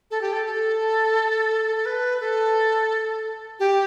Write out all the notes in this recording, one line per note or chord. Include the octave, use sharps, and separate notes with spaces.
A4
G4
A4
A4
A4
B4
A4
G4